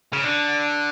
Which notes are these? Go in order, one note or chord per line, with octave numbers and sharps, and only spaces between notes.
C#3
D3